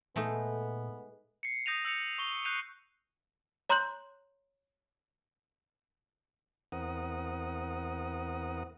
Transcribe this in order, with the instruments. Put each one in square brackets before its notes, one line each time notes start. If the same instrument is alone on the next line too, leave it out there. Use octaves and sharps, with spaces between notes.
[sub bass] A#2 [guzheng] G#3 A3 D#4 [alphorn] B3
[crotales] C7 C#7
D#6 G6 A#6 D#7 F7
E6 G6 C#7 F7
C#6 F7 G7
F#6 G6 C7 D#7 F7
[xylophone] C#5 A#5 C6 F#6 G6 F#7
[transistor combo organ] E2 C4 A#4 F#5 D#6